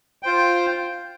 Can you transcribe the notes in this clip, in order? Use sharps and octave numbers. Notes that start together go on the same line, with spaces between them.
F4 C5 G5